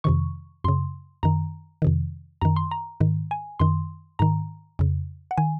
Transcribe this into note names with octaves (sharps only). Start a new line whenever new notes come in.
F2 C3 D#3 C#6
F#2 C#3 C6
F#2 D#3 A#5
F2 C3 D#3
F#2 D#3 A#5
C6
A#5
G#2 D#3
G#5
F#2 D#3 C6
G#2 D#3 A#5
F2 C#3
F#5
D#3 G#5